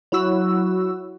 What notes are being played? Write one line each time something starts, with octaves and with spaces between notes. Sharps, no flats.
F#3 E4 F#4 E6